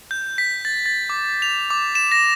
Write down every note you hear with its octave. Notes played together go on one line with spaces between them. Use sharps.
G6
B6
A6
A6
D6
F7
D6
E7
A#6